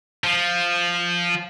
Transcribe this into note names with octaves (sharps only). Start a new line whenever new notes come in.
F3